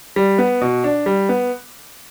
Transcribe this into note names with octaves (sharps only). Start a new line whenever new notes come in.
G3
B3
B2
D4
G3
B3